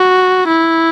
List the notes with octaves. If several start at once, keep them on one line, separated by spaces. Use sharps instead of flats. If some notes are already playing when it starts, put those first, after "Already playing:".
Already playing: F#4
E4